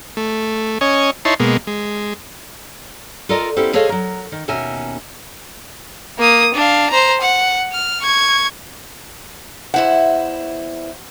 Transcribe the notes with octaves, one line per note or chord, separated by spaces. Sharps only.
A3
C#4 C#5 D#5 G#5
D#4 E4 C#5 A5 C6
B2 G#3 A#3
G#3
F4 A4 A#4 D5 D#5
B3 C#4 E4 G4 A4 C5
G#4 A4 C5 C#5 D#5 F5
F#3 A#4
D#3
D#2 B2 C#4 A#4 E5 G#5
A#3 D#6
D4 F5
C5 A#5
F#5
F6
C#6 G#6
E2 E4 C5 F#5